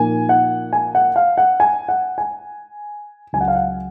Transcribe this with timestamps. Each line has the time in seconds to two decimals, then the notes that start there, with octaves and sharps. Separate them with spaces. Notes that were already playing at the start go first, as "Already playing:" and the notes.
Already playing: A#2 F3 A#3 D#4 G#5
0.29 F#5
0.73 G#5
0.95 F#5
1.16 F5
1.38 F#5
1.60 G#5
1.89 F#5
2.18 G#5
3.33 C#2 C#3 F#3 G#5
3.41 F#5
3.48 F5
3.55 F#5